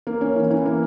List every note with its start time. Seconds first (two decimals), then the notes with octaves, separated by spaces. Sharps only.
0.07 A#3
0.21 C#4
0.36 E3
0.51 E3
0.66 A#3